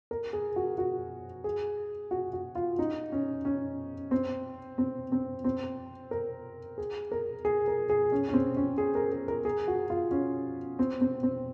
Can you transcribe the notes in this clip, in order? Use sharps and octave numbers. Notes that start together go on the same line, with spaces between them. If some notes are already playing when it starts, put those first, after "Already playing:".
A#4
G#4
F#4
F#4
G#4
F#4
F#4
F4
D#4
C#4
C#4
C4
C4
C4
C4
A#4
G#4
A#4
G#4
A#4
G#4
C#4
C#4
C4
C#4
G#4
A#4
G#4
A#4
G#4
F#4
F4
C#4
C4
C4
C4